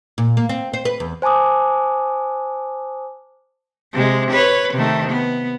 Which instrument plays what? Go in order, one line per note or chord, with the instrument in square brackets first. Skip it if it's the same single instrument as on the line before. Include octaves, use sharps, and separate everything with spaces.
[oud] A#2
A#3
C4
C5
B4
E2
[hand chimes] C5 G#5 A5 D6 D#6
[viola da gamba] C3 G#3
B4 C#5
C3 D#3 A3
B3